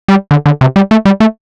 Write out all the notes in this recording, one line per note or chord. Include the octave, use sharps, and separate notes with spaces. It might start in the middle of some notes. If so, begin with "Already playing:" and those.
G3
D3
D3
C3
G3
A3
G3
A3